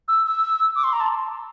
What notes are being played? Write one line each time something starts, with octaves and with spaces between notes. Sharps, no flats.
E6
E6
D6
C6
A#5
A5